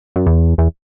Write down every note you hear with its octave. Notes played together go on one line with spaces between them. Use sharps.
F#2
E2
E2